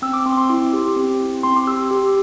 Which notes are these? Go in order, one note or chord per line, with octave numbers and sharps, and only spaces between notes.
C4 E6
D6
C4 C6
D6
C6
E4
G4
C4
E4
C4 C6
D6
G4 E6
G4